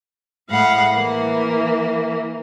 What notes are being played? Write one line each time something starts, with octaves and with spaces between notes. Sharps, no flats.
A2 G#3 F5 F#5 B5
E3 A#3